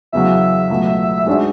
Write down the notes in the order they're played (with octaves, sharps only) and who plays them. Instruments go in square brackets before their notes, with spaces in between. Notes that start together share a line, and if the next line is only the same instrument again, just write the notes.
[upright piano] E2 C#3 F#3 [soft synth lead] E5
[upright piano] C#2 B2 F#3 A3
G#2 G#3 D4 F#4